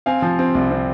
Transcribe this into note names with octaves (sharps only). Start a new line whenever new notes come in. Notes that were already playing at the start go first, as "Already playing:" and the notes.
C4 F5 G#5
F3
C4
C2
C4